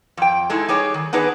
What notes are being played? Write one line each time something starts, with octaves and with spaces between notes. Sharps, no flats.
F2 G5
G#3 A3 D#4 E4
G3 D#4 G4 G#4 C#5
D#3
B3 D4 D#4 G#4 B4